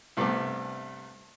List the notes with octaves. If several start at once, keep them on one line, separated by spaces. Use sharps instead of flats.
C2 G2 A3 B3 C4 D6